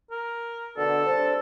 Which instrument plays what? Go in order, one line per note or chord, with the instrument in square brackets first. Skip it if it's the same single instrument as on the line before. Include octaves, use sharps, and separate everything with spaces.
[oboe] A#4
[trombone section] B2 D3 D4 [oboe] A4
[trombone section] C2 D4 C5